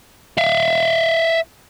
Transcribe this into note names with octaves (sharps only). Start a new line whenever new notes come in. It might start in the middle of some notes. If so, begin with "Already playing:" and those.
E5 F5